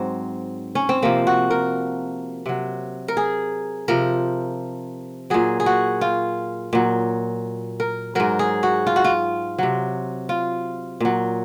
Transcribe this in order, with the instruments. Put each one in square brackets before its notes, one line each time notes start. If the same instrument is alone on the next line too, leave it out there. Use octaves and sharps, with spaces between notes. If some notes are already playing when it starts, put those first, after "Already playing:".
Already playing: [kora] G#2 F#3 C4
C#4
C4
C3 F3 A#3
F#4
A#4
C3 F#3
A#4
G#4
C3 F3 A#4
A#2 F#3 G#4
G#4
F#4
F4
A#2 F#3
A#4
G#2 F#3 A#4
G#4
F#4
F4
F#4
F4
C3 F#3
F4
A#2 F#3